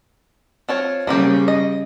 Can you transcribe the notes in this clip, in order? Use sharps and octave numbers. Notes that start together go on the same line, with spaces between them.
C4 F4 C#5
C#3 G3 A#3 C4 G4
D#5